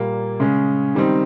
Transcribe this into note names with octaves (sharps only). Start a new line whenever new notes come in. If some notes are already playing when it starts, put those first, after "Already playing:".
Already playing: A#2 G3 A#3
C#3 G#3 C#4
D#3 G3 C4 D#4